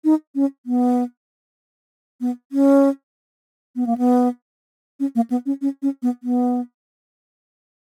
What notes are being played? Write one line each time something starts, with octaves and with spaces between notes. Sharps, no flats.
D#4
C#4
B3
B3
C#4
B3
A#3
B3
C#4
A#3
B3
C#4
C#4
C#4
B3
B3